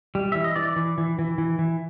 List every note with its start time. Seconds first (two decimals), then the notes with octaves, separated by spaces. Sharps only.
0.15 G3
0.32 E3 E5
0.44 D#5
0.56 E3 D5
0.76 E3
0.98 E3
1.19 E3
1.38 E3
1.59 E3